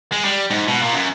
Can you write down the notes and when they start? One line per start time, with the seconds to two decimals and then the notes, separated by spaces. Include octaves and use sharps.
0.12 G#3
0.25 G3
0.50 G#2
0.68 B2
0.82 A#2
0.94 F#2